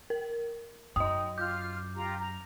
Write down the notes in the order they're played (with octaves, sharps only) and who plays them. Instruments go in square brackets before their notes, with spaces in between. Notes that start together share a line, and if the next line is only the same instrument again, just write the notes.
[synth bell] A#4
[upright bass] F#2 [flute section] D#4 [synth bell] D#5 G5 [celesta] D#6
[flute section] F4 F6 [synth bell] D6 [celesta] G6
[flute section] F4 G4 A#5
A#5